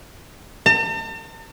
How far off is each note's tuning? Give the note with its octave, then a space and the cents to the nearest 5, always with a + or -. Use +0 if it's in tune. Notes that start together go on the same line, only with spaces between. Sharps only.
A5 +45